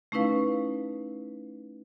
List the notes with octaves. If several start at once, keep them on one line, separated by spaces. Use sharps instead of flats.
A3 C#4 D#4 E4 B4 F5